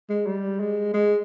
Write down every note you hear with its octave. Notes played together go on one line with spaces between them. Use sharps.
G#3
G3
G#3
G#3